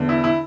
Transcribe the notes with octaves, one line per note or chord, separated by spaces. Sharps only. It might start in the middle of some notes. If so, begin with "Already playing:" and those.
Already playing: E2 D3
E4
E4